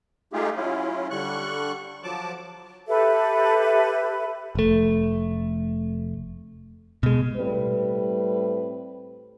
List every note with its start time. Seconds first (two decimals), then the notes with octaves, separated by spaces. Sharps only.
0.33 G#3 A3 D#4 F4 G4 G#4
0.56 F#3 C#4 E4 F4
1.11 D3 G3 C#6 F#6
2.03 F3 F#3 A5 D6
2.88 G4 A4 B4 E5
4.55 F1 A3
7.03 B2 G#3
7.37 A2 G3 C4 B4